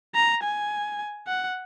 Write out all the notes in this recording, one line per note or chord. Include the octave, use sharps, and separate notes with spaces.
A#5
G#5
F#5